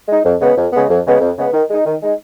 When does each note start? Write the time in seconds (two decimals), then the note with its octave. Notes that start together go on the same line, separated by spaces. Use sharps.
0.08 G#3 D#4
0.24 F2
0.41 C#3 G#3 B3
0.57 F2
0.73 C#3 G#3 B3
0.89 F2
1.05 C#3 G#3 B3
1.21 F2
1.37 C#3 G#3 B3
1.53 D#3
1.69 G#3 D#4
1.85 D#3
2.02 G#3 D#4